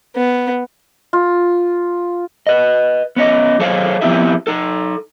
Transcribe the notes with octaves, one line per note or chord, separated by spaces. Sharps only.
B3
F4
B4 D#5
B3 C#4 D#5
F#3 G#4 A4 C5 C#5 F5
F3 B3 C4 E4 G4 E5
D#4 A4